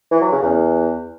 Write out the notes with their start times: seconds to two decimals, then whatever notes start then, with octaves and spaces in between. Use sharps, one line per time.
0.11 E3
0.22 F#3
0.32 C#3
0.43 E2